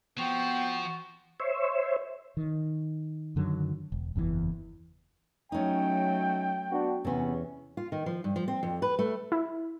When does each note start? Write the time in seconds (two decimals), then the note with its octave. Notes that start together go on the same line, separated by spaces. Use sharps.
0.18 F3 B3 C4 F#4
1.40 C5 C#5 E5
2.37 D#3
3.36 F#2 D3 D#3 F#3
3.92 E1
4.16 F#1 E2 A#2 E3
5.52 F#3 A3 C#4 D#4 G5
6.70 B3 D4 F#4
7.05 E2 C3 B3 C#4
7.77 F4
7.92 D#3
8.06 F3
8.24 G2
8.36 F3
8.48 C4
8.63 F2
8.82 B4
8.99 A3
9.32 E4